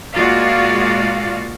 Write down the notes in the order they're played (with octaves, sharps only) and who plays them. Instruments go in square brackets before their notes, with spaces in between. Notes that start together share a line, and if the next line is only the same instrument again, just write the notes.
[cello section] A#2 G#3 F4 F#4 D5 F5